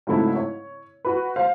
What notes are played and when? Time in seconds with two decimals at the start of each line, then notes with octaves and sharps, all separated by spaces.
0.07 G#2 C#3 F#3 A3 C4 E4
0.35 C#5
1.05 F#4 B4
1.36 C5 F5